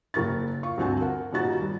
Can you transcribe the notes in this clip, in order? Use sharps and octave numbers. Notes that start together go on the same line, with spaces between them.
F#1 A#4 C#6 A6
F4 C#6
D2 G2 C4 F#4 G#5 A5
A#4 F#5
D#1 A#2 D#4 F#4 A6
G3